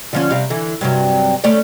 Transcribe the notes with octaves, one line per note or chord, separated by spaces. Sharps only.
D3 F3 C#4
C3 G3 F5
D3 E3
G2 C3 F#3
A3 C#4 D5